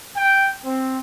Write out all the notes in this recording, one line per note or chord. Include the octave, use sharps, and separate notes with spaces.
G5
C4